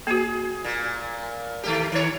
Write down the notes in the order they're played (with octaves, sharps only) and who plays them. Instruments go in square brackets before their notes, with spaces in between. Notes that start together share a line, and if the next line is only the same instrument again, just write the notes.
[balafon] A#3 F#4 [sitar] G#4
[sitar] A#2
D#3 A3 G4
D#3 C#5